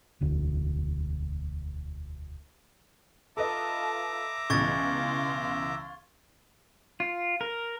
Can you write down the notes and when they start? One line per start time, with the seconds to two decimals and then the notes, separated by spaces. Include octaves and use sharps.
0.21 E1 D2 D3
3.37 F4 A4 B4 D#5 E5 A5 A#5 D6
4.50 C#2 B2 E3 F5 C6 C#6 G#6 A6
7.00 F4
7.41 A#4